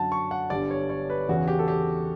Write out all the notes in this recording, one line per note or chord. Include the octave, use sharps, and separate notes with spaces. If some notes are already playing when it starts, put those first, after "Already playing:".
Already playing: F#2 D3 F#3 F#5 A5
C#6
F#5
G1 G2 D3 G3 D5
C#5
C#5
B4
E2 C#3 E3 F#4
G4
A4
G4